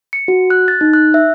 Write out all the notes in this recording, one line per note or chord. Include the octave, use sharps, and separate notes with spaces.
C#7
F#4
F#6
A6
D#4
F#6
E5